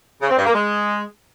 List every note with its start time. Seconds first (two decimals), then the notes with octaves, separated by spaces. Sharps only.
0.22 C#3
0.30 C4
0.38 G2
0.46 A#3
0.54 G#3